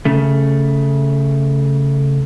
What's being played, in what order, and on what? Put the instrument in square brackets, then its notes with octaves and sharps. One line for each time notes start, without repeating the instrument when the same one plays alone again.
[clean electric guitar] C#3 A3